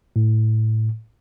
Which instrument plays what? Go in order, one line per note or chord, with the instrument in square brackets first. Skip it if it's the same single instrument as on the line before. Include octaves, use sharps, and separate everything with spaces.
[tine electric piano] A2